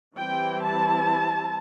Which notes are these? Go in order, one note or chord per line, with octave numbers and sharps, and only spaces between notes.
E3 G3 C4 E4 G5
A5